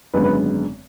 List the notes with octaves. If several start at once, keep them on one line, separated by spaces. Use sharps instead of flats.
G#1 F#2 D3 G#3 B3 B4
B4